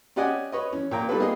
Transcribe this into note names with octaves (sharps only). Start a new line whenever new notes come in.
C#4 G4 D5 D#5 F#5 G#5
B4 C#5 D#5
E3 C#4
A#2 G5 A#5
D#3 G3 B3 F4 A4 B4
A#3 B3 G4 G#4 D#5